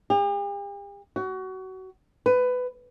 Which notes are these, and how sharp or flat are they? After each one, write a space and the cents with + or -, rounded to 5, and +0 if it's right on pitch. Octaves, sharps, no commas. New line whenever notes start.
G4 +45
F#4 +25
B4 +15